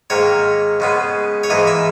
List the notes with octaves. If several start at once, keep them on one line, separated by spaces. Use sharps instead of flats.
G#2 D#3 A#3 C#5
C#3 G#3 B3
C#5
G#2 E3 A#3 D#5
E5